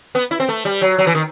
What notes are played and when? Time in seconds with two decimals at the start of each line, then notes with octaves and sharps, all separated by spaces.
0.15 B3
0.31 E4
0.40 C4
0.49 A3
0.65 G3
0.82 F#3
0.98 F#3
1.07 E3
1.15 D#3